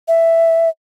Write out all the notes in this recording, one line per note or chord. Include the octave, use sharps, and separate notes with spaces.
E5